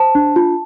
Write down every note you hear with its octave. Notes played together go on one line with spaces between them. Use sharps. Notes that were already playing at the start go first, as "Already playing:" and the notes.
Already playing: C5 A5
D4
F4